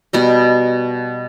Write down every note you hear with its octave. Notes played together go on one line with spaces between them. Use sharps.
B2 G3 D#5